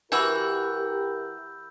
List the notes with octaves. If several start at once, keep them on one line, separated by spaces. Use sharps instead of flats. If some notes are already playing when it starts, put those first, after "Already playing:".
E3 E4 F#4 G4 A#4 B5 E6 G6